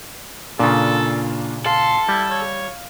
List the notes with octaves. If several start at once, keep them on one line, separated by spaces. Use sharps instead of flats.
A#2 C#3 A#3 D4 F4 A4
A4 F5 C6
G3 E4
C#5